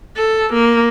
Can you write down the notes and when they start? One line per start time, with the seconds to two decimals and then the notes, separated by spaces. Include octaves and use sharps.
0.17 A4
0.54 A#3